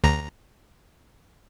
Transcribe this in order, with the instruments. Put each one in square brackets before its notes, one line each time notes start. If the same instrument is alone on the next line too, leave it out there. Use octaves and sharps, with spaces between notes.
[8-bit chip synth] D2 A#5